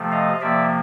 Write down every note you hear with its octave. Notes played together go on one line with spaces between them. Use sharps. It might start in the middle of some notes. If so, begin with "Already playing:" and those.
Already playing: C3 F3 A3
D#5 F5
C3 F3 A#3 D5 E5